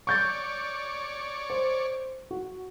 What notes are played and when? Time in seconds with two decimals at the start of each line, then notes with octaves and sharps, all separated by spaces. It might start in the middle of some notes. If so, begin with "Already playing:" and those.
0.07 C#5 D5 C#6 G6 A6
1.50 C5
2.31 F#4